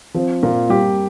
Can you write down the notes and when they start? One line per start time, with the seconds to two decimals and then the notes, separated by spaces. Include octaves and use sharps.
0.14 F3 C4
0.43 A#2 A#3
0.69 G3 G4